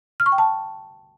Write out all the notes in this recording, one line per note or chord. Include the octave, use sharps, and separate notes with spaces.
F6
C#6
G5
A5